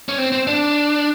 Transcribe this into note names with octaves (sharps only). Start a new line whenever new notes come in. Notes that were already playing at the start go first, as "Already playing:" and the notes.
C#4
C4
C4
D4